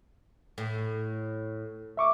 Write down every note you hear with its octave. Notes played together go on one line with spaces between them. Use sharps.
A2
E5 C#6 D6